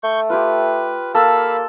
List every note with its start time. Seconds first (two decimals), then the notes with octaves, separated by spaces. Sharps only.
0.03 A3 C#6 G6
0.30 F4 G4 B4
1.15 A#3 A4 F5 B5 E6